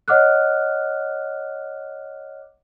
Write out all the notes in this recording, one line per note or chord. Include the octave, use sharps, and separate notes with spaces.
C#5 D#5 F#5 D6 F6 F#6